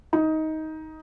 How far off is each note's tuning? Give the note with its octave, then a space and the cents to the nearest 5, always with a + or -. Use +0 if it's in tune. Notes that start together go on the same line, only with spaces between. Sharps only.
D#4 +15